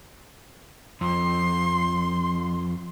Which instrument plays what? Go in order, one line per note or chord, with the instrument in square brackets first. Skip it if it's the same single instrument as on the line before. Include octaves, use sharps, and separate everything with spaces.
[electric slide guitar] F2 [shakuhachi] C6